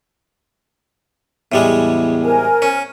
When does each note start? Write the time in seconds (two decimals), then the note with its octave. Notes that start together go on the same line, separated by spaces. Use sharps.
1.52 E2 A2 G3 G#3
2.24 A#4 C5 G#5
2.62 C#4